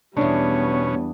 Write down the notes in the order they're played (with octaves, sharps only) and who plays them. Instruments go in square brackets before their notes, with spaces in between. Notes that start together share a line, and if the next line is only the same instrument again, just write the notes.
[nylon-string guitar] E2 D4 [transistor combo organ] B2 C#4 [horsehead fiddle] G3 B3 [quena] C#5